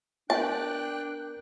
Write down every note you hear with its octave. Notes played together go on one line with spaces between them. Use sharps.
B3 D4 A#4 G5 A5 F#6